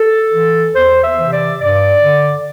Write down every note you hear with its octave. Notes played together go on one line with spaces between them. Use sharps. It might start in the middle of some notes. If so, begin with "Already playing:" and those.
Already playing: A4
E3
E2 C5
E5
C3 E3
D5
G2 D5
D3